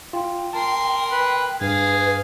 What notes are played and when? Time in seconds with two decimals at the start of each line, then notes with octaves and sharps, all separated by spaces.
0.13 F4 G5
0.53 A#4 A5 C6
1.12 B4
1.61 G2 G#4 B4 F5